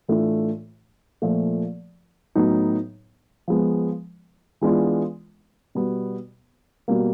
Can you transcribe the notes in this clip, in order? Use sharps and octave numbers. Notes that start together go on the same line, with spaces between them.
A2 E3 A3 D4 F4
A#2 F3 A3
A2 F#3 B3 D#4
F3 G#3 B3
E3 G#3 B3 D4 F4
B2 G3 B3
B2 G3 A#3